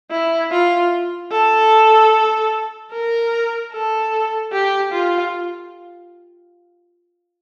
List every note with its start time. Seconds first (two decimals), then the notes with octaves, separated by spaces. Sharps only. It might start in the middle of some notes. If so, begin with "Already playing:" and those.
0.11 E4
0.51 F4
1.31 A4
2.92 A#4
3.72 A4
4.52 G4
4.93 F4